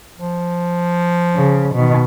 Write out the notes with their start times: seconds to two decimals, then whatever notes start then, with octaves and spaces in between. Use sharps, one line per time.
0.18 F3
1.35 C#3
1.75 B2 D#3